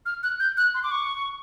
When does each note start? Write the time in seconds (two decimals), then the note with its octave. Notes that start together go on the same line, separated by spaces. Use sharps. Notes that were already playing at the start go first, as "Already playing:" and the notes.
0.06 F6
0.23 F#6
0.40 G6
0.57 F#6
0.74 C6
0.83 D6
0.91 C#6